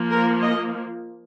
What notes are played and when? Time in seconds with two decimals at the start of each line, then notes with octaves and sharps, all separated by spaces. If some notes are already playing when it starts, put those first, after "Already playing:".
Already playing: F3 A#3
0.10 A#4
0.42 D#5